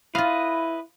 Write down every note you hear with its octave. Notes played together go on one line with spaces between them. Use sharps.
E4 F4 B4 D#5 F5